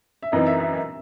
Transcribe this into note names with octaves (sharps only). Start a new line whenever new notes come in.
E5
F#2 E3 C4 D#4 D#5
E5
E5
E5